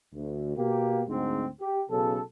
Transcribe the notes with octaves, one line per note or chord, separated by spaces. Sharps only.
D2
B2 A#3 G4
D2 G#2 C4
G4
B1 C#3 A4